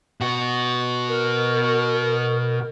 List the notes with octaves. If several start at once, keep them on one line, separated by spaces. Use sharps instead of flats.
B2 F#4
A#4